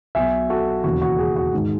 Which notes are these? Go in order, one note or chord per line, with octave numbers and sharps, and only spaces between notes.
B1 B2 F#3 E5 G#5
F#4 A4
E1 D#2 C#3 E3 F#4
F#4
G#4
F#4
G#2 D#3 G#3